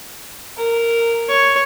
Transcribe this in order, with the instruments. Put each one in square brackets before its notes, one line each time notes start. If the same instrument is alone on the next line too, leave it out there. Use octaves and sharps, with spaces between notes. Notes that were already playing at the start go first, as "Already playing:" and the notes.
[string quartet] A#4
[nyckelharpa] C#5